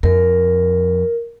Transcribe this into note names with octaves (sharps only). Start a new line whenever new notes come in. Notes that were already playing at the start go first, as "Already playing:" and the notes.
F2 A#4